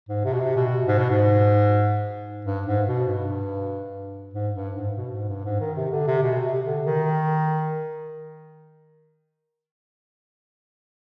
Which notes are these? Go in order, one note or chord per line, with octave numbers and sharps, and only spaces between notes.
G#2
C3
B2
C3
B2
G#2
B2
G#2
G2
G#2
B2
G2
G#2
G2
G#2
B2
G#2
G2
G#2
D#3
C3
D3
C3
B2
C3
D3
D#3